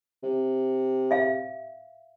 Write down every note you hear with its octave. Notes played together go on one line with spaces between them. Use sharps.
C3
E5 F5